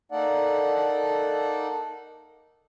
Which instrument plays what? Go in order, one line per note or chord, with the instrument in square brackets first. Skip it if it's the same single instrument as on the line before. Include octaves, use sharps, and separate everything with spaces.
[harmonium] A#3 D#4 A4 D5 F#5